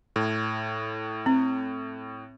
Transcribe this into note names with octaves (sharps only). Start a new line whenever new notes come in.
A2
C4